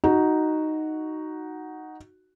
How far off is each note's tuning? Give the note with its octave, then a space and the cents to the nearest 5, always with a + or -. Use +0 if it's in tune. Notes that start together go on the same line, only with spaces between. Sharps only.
D#4 +0 F#4 +0